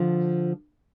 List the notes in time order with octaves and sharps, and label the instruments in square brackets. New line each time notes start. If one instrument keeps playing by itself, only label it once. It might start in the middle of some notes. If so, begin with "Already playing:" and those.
Already playing: [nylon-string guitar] D3 F3